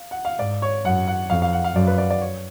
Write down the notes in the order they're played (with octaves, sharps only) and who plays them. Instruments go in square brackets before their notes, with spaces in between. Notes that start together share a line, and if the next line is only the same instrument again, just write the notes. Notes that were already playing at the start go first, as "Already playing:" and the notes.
Already playing: [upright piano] F5
F#5
F5
[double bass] G#2 [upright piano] D5
[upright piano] C#5
[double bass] F#2 [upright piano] F#5
[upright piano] F#5
[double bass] F2 [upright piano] F5
[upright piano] F5
F#5
F5
[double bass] F#2 [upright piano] D5
[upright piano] B4
D5
D5
C#5